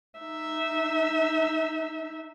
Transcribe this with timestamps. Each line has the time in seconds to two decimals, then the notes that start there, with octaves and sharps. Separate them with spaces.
0.20 D#4 E5